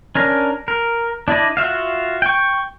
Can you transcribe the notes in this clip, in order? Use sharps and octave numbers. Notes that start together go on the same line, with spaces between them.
C#4 D4 A#4
A#4
D4 E4 D5 D#5
F4 F#4 E5 F5
G5 C#6